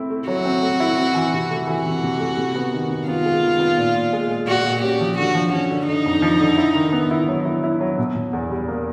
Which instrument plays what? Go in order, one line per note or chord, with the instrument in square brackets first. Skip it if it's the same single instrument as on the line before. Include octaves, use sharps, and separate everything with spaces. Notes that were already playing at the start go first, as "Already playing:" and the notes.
Already playing: [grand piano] A3 C4 E4
A3
[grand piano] F#3 [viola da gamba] F#4
[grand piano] C4
A3
E4
C4
E3
C3
A3
[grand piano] E3 [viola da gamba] F#4
[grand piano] C3
C3
A3
C3
B3
D#3
B3
[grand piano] B3 [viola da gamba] F4
[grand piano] G#3
D#3
B3
A#2
A#2
G#3
G#3
[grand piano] A#2 [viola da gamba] F#4
[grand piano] A#2
[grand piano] C#4 [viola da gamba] G4
[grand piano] F3
[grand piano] D3 [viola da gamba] F#4
[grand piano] F3
[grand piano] F3 [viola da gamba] C#4
[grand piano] D3
[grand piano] D3 [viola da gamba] D#4
[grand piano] F2
F3
D3
E4
D#3
B3
E4
F#3
E4
E4
F#3
B2
B2
E2
G3
A#3